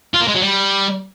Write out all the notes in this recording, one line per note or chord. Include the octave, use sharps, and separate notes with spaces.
F4
A#3
G#3
F#3
G3